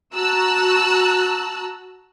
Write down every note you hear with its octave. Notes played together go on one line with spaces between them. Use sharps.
F#4 A5 A#5 E6 F#6